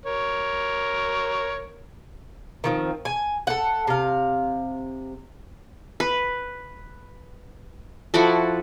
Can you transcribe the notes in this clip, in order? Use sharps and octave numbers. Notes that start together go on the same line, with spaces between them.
A#4 C#5
D#3 F3 C4
G#5
A4 F#5
C3 F5
B4
F3 E4 F#4 A4